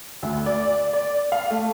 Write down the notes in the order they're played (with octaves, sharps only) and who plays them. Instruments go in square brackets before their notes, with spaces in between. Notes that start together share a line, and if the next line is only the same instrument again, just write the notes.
[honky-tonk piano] D2
D5
D5
F5
A3